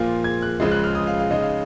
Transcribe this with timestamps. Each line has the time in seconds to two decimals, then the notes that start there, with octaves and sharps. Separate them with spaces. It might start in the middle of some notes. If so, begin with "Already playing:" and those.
Already playing: A#2 F3 A#3 F4
0.24 G#6
0.42 F#6
0.60 C#2 C#3 F3 G#3
0.72 F#6
0.84 F6
0.95 D#6
1.07 F5
1.19 F5
1.31 C#3 G#3 D#4 D#5
1.42 F5